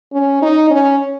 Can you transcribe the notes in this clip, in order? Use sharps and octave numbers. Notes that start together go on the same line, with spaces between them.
C#4
D#4
C#4